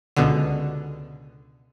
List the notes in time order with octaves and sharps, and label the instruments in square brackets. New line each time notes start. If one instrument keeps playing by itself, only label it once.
[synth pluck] C#2 B2 D3